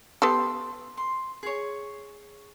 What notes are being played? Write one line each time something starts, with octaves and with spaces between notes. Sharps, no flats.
B3 G4 A4 C6
C6
G#4 C#5